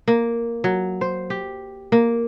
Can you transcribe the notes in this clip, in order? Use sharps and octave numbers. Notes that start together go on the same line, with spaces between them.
A#3
F#3
C5
G4
A#3